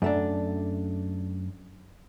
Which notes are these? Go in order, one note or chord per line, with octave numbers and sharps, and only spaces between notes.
F#2 A3 D4